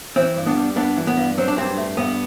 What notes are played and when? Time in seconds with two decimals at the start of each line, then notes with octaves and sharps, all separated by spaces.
0.16 E3 C4
0.36 G2
0.46 B3 D4
0.56 G3
0.76 G2 B3 D4
0.97 E3
1.07 B3
1.17 G2
1.37 F#3 C4
1.48 D4
1.57 G2 C4
1.77 A3
1.97 G2 B3